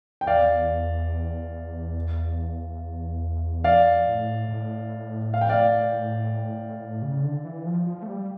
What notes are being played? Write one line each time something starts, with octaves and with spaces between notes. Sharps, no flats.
G5
E2 D5 F5
F2 D5 F5
A2
A2
F5
G5
D5 F5
C#3
D3
E3
F3
F3
A3
G3